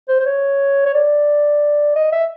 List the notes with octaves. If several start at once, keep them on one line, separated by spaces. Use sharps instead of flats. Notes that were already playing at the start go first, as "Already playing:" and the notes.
C5
C5
C#5
C#5
D5
D#5
E5